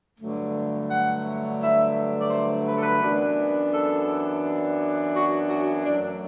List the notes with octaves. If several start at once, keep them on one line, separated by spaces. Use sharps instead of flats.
G2 D3 F#3 A3
F#5
E5
D5
C5
B4
A4
B4
F#2 E3 B3 D4
A4
F#4
F#4
F#2 F#3 A3 D4